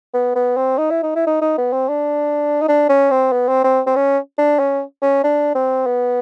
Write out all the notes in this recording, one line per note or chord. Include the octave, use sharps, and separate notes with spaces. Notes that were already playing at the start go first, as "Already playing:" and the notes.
B3
B3
C4
D#4
E4
D#4
E4
D#4
D#4
B3
C4
D4
D#4
D4
C#4
C4
B3
C4
C4
C4
C#4
D4
C#4
C#4
D4
C4
B3